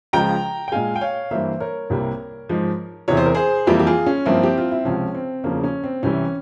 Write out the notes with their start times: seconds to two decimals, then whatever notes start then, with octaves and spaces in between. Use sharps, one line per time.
0.13 C#2 C#3 F3 G#3 G5 A#5
0.68 G5
0.72 A#2 G#3 F5 G#5
0.96 G5
1.01 C#5 F5
1.31 G2 E3 A#3 C5 E5
1.60 A#4 C#5
1.90 C2 C3 G3 A#3
2.49 G#2 F3 G#3
3.08 E2 C3 E3 C#5
3.17 C5
3.26 A#4
3.35 G#4 C5
3.67 F2 E3 G3 A#3 E4 G4
3.79 G4
3.87 F4 G#4
4.06 C#4
4.26 G2 F3 A#3 C4 E4
4.43 G4
4.58 F4
4.72 E4
4.85 C#2 C3 F3 C#4
5.15 C4
5.44 E2 C#3 F3 A#3 C#4
5.63 C#4
5.84 C4
6.03 C2 C3 E3 G3 C#4